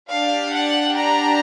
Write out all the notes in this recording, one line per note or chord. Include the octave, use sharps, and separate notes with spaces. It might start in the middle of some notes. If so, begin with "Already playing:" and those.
D4 G4 F5
F#5
A#5